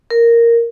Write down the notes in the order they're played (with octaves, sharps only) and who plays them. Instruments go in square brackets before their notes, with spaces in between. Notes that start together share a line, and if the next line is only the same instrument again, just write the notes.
[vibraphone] A#4